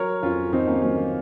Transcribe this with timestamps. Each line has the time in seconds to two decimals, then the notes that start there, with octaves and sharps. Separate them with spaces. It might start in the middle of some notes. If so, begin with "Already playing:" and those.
Already playing: F#3 A#4 C#5
0.22 F2 C#4 F4
0.52 F2 C4 D#4
0.67 A#3 C#4
0.82 F#3 A#3 C#4
0.96 A#3